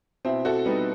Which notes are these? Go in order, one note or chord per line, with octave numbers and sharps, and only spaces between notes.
B2 C4 E4
F#4 A4
G3 B3 D#4